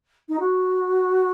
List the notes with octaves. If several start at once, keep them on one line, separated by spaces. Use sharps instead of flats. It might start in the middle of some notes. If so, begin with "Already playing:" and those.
D#4
F#4